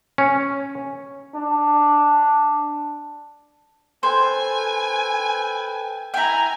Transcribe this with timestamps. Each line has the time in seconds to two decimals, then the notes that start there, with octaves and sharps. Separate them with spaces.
0.18 C#4
1.35 D4
4.03 A4 B4 C5 G5 G#5
6.14 E4 G5 G#5 A#5